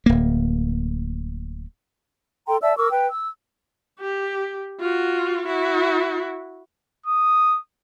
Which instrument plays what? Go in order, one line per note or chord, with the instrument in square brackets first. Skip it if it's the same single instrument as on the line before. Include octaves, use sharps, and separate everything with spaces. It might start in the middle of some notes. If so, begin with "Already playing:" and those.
[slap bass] D1 A#3
[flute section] A4 G5 A#5 C6
D5 E5 A5 E6
A#4 C#6 D6 E6
B4 G5
E6
[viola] G4
F4 F#4
E4 F#4
[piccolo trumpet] D#6